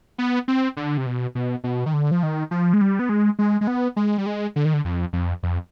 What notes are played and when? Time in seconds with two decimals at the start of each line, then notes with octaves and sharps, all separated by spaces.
0.18 B3
0.48 C4
0.77 D3
0.97 C3
1.06 B2
1.35 B2
1.64 B2
1.86 D#3
1.93 D3
2.11 F3
2.23 D#3
2.51 F3
2.73 G#3
2.81 G3
2.99 B3
3.09 G#3
3.39 G#3
3.61 G#3
3.67 B3
3.96 G#3
4.18 G3
4.26 G#3
4.56 D3
4.65 D#3
4.74 D3
4.85 F2
5.13 F2
5.43 F2